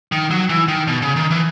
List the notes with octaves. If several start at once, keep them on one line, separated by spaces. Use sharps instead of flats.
D#3
F#3
E3
D#3
B2
C#3
D#3
E3